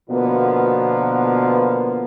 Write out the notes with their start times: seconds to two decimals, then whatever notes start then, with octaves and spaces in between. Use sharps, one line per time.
0.10 B2 D3 F3 A#3 B3